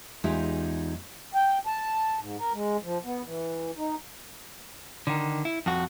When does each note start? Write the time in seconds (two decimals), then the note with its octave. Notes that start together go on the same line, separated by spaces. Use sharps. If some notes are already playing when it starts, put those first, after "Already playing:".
0.24 E2 G#3 D#4 F4 G4 E5
1.35 G5
1.67 A5
2.19 G#2
2.38 A#4
2.53 G#3
2.83 F3
3.05 B3
3.25 E3
3.77 D#4
5.07 D3 D#3
5.45 E4
5.66 F2 F#4